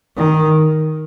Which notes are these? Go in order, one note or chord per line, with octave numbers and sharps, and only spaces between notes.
D#3